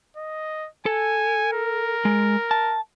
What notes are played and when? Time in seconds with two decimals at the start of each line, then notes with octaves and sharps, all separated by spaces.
0.17 D#5
0.86 A4 G#5
1.53 A#4
2.05 G#3
2.51 A5